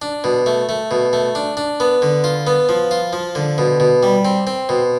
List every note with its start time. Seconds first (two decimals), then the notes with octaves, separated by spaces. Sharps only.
0.02 D4
0.24 B2
0.46 A3
0.69 A3
0.91 B2
1.13 A3
1.35 D4
1.57 D4
1.80 B3
2.02 D3
2.24 F4
2.47 B3
2.69 F3
2.91 F4
3.13 F3
3.35 D3
3.58 B2
3.80 B2
4.03 G3
4.25 C4
4.47 C4
4.69 B2